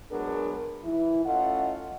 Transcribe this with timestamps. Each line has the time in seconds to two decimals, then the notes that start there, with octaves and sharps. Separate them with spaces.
0.10 F#3 G#3 B3 D4 G#4 A#4
0.83 E3 E4
1.24 A3 C#4 F4 A4 D#5 F#5